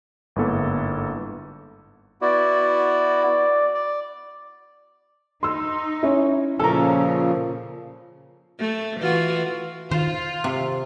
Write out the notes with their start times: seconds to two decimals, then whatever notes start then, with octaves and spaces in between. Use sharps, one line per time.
0.36 G1 G#2 A#3 B3 E4 A4
2.21 B3 E4 F#4 D5
3.74 D5
5.43 D#4 C6 E6
6.03 C#4 E4
6.60 A#2 C#3 F3 C#4 A4 A#4 A5 E6
8.59 A3
9.00 E3 F4 F#4
9.91 D#3 F4 C5
10.44 C3